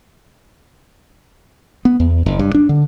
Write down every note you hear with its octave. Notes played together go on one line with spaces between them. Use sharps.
B3
E2
F#1
G2
D4
D3